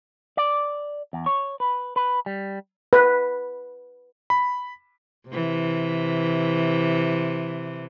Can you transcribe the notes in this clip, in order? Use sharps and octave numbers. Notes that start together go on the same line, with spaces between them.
D5
E2
C#5
B4
B4
G3
B4
B5
C3 E3